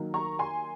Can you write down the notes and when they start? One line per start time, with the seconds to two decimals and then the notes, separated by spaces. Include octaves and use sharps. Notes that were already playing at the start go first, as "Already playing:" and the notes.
Already playing: D#3 F#3 A#3
0.14 A#5 C#6
0.39 G#5 C6